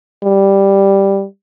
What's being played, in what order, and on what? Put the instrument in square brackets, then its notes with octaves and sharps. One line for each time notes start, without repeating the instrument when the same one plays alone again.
[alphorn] G3